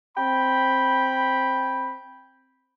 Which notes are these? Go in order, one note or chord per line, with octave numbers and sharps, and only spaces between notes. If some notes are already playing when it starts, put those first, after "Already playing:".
C4 G5 B5